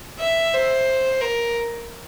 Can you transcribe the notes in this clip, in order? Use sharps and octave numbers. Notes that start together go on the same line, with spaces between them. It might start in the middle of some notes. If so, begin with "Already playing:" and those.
E5
C5
A#4